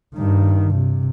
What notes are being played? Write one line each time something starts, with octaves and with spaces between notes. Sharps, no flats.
G2 D#3
C3